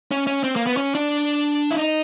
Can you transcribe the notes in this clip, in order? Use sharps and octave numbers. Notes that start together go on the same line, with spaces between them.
C#4
C#4
C4
A#3
B3
C#4
D4
E4
D#4